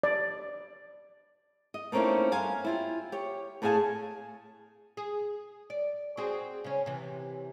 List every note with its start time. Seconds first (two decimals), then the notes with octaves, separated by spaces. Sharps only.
0.03 D5
1.74 D#5
1.92 A3 A#3 C4 C#4 D#4 E4
2.31 G2 C5 F5 G#5
2.64 E4 F4 G4
3.12 G4 C#5
3.62 A2 A3 G#4 F5 G#5 A5
4.97 G#4
5.70 D5
6.17 C4 F#4 G#4
6.64 C#3 C#4
6.86 C3 E3